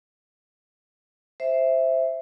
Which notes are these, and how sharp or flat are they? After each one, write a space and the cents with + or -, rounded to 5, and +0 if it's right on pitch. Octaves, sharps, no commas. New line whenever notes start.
C5 +0 E5 +0